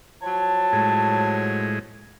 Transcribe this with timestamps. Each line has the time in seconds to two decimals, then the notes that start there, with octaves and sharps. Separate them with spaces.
0.22 F3 F#3 C#5 A5
0.73 A2 G#3